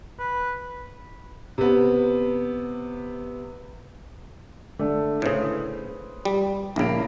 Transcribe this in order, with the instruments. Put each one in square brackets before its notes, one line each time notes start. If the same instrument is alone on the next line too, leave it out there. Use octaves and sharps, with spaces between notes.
[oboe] B4
[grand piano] C3 B3
[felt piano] D3 A3 D5
[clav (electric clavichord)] A2 C#3 [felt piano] B4 C5 D#6
[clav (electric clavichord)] G3
[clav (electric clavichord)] A#1 C#3 [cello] A#3 [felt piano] E4 D7